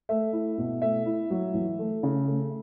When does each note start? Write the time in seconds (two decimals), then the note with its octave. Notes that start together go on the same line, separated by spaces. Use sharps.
0.09 A3 E5
0.33 E4
0.58 B2
0.81 A3 E5
1.06 E4
1.30 F#3
1.54 E3
1.79 A3
2.03 C#3
2.27 A3